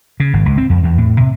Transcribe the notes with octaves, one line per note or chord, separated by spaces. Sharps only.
C#3
G#1
C#2
C4
F2
E2
A2
C3